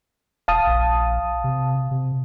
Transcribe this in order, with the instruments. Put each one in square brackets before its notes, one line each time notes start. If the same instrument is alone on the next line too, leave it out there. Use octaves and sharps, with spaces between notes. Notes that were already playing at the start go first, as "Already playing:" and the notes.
[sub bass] E1 [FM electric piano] F5 A5 D#6
[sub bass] A#1
C3
C3